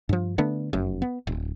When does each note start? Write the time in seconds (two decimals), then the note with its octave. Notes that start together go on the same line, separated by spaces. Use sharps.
0.09 G2 F3
0.38 D3 A3 B3 D4
0.73 F1 F#2
1.02 B3
1.27 D1